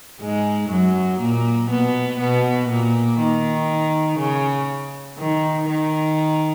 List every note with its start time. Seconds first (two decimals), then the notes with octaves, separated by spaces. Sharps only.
0.21 G#2 G#3
0.70 F#2 F#3
1.20 A#2 A#3
1.70 B2 B3
2.20 B2 B3
2.69 A#2 A#3
3.19 D#3
4.19 C#3
5.18 D#3
5.68 D#3